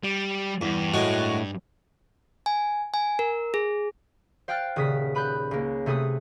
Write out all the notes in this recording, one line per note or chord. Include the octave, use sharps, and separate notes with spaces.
G3
E2 G2
A2 G#3 F#4
G#5
G#5
A#4
G#4
C5 F5 G5 F6 F#6 A6
D#1 C#3 D#6 B6
B4 B5 F#6 G6
C#2 A#3
C3 A3 G#4 B4 D#6